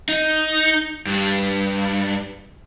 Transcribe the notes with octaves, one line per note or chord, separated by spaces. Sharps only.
D#4
G2